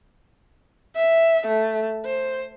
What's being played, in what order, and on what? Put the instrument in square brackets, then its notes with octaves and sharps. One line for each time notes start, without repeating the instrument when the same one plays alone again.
[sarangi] E5
A3
C5